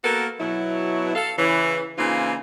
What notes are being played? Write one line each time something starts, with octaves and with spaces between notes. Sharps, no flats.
A#3 B3 F#4 A4 A#4
B2 F#3 E4
A4 F5
C#3 E3 C#5
C#3 E3 A#3 C4 D#4 F4